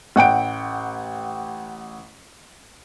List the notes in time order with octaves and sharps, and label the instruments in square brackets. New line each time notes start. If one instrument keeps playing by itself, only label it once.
[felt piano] A1 F#5 G5 D7